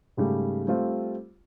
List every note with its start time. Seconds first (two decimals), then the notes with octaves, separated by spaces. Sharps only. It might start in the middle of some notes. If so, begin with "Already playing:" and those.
0.17 G#2 C#3 G3 A3
0.67 G3 A3 C4 F4